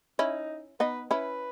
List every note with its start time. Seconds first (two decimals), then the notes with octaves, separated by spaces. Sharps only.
0.19 C#4 D#4 E4
0.80 B3 D#4 B4
1.11 C#4 E4 B4